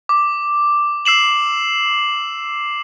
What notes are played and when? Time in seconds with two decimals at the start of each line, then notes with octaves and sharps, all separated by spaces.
0.09 D6
1.05 E6 C7 E7 F#7